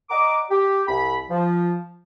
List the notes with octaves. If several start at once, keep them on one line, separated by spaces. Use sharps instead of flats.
D5 D#5 F#5 A#5 D6
G4
C2 B5
F3